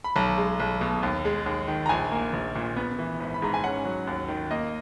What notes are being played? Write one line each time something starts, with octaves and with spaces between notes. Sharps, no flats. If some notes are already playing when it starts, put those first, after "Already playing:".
B5
B1 A#5
G#3
B1
B2
D#2
G#3
D#2
D#3
A#5
A#1 G#5
A#3
A#1
A#2
B3
E3
G#1
B5
G#2 A#5
G#5
C#4 F#5
F#3
D#2
D#3
A#3 D#5